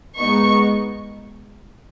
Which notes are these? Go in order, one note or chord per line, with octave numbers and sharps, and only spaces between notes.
G#2 G#3 B3 D#4 C#6